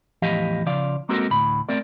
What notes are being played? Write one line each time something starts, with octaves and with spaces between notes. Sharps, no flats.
E2 A2 F3 G4 D#5 F5
C#3 F3 D5 F5
G#3 A#3 C4 F#4 A4 A#4
D2 A2 B5
A3 C4 A#4 D5